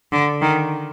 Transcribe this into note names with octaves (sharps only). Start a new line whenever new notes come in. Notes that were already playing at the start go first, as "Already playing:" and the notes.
D3
D#3